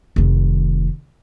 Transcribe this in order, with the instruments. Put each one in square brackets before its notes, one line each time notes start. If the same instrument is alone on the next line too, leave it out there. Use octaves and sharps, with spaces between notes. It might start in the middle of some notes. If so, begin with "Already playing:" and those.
[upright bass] F1 D#3